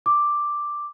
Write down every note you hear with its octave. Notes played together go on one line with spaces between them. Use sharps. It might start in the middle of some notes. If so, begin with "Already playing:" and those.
D6